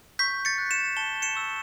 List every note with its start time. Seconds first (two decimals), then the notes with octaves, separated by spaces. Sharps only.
0.19 C#6 G6 B6
0.45 A6 C#7
0.58 F#6
0.71 C#7 E7
0.97 A5 E7 G7
1.22 C#7 E7
1.35 C#6 E6